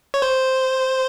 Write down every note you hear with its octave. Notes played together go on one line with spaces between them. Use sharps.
C#5
C5